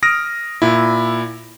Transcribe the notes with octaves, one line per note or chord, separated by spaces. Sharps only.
D#6 F6 A#6 D7
A#2 E4